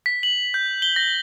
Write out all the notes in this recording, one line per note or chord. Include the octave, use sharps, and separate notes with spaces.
B6
F#7
G6
G7
A#6